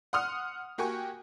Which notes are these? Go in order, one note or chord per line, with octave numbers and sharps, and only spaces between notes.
F#5 C6 D#6 F6
A#3 F#4 G4 G#5 C#6